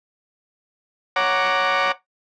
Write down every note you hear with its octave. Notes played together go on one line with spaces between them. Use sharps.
C#5 F#5 A#5 D6